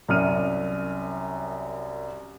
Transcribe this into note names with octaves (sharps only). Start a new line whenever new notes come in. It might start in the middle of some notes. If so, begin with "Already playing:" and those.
C2 F#2 F6 D#7